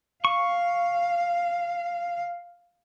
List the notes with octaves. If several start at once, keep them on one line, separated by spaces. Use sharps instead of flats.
F5 C#6